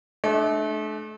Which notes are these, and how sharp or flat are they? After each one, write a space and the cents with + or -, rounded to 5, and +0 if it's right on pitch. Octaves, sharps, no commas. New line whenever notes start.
A3 -35 D4 +25